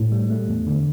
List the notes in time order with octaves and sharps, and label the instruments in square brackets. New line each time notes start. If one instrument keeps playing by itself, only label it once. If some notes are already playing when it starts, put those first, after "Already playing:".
Already playing: [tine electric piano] A2
G3
A3
E2
D3